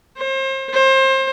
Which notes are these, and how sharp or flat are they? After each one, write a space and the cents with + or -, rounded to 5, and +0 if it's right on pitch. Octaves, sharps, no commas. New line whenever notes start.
C5 +35
C5 +30